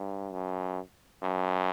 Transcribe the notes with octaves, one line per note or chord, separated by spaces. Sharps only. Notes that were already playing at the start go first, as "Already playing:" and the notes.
Already playing: G2
F#2
F#2